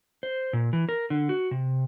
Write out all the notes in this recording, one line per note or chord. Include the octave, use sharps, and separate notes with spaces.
C5
A#2
E3
A#4
D3
F#4
C3